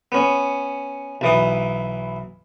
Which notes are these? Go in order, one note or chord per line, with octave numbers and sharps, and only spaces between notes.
B3 C#4
B1 E3 D#6